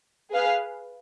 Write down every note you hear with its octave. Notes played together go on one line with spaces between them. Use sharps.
G#4 B4 F5